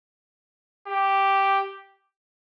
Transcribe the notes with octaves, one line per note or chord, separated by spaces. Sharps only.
G4